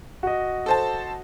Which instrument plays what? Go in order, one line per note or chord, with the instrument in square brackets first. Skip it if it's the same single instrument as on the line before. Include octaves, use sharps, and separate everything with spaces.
[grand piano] F#4 D#5
[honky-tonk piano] A4 C5 A5